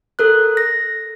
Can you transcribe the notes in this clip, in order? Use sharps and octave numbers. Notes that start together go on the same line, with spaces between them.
A4 A#4 F#6
A#6